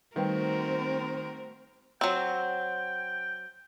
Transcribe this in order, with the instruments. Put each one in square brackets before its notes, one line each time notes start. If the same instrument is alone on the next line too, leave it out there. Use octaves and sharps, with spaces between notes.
[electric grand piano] D#3 [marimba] G3 B4 G5 [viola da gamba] A3 F#4 A#4 [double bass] C4
[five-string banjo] F#3 C4 [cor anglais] G5